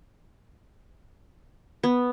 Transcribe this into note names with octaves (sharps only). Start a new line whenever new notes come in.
B3